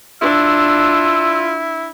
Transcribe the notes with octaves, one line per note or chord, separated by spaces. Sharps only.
D4 E4 F4 E6